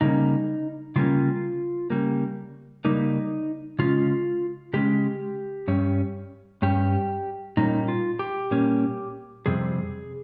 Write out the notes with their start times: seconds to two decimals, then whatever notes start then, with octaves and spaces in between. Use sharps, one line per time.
0.01 C#3 G3 A#3 C#4 D#4
0.96 C#3 G3 A#3 C#4 F4
1.90 C#3 G3 A#3
2.85 C#3 G3 A#3 D#4
3.79 C#3 G#3 C#4 F4
4.73 C#3 G#3 C#4 G4
5.68 G2 G3 C#4
6.62 G2 G3 C#4 G4
7.57 A#2 G3 A#3 C#4 D#4
7.88 F4
8.19 G4
8.51 A#2 G3 A#3 C#4
9.46 F2 C3 G3 C4 G#4